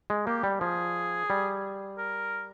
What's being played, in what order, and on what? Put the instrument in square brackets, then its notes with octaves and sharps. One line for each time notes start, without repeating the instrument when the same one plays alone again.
[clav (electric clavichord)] G#3
[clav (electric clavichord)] A#3 [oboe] G4
[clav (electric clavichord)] G3
[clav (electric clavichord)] F3 [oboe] G#4
[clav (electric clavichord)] G3
[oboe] A#4